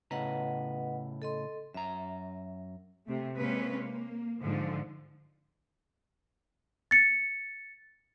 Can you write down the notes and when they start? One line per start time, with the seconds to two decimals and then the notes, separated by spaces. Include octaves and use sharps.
0.11 A2 C#3 B4 D#5 F#5 A#5
1.22 A4 D#5 C6
1.74 F#2 E5 A#5
3.07 C3 A3
3.38 C3 G#3 A#3 C4 C#4 B4
3.81 A#3
4.43 G#2 D3 F3
6.91 A6 C#7